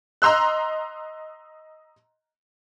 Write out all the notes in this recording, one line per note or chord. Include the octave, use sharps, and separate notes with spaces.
D#5 A#5 C6 E6 F#6